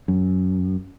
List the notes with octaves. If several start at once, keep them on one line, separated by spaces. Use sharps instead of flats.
F#2